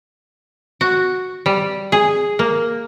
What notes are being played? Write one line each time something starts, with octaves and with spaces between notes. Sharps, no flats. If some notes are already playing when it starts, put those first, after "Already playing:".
F#4
G3
G#4
A#3